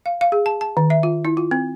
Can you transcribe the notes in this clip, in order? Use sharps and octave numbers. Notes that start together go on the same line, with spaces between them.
F5
F5
G#4
A5
A5
D#3
E5
F4
E4
F4
C4